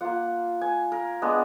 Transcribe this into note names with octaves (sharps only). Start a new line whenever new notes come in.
A#3 F4 F#5
G#5
A#4
G#3 B3 D4